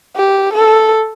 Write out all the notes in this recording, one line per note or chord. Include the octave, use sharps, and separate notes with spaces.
G4
A4